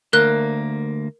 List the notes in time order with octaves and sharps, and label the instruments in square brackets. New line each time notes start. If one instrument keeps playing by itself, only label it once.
[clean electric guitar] D2 A#3 [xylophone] A#4 F#6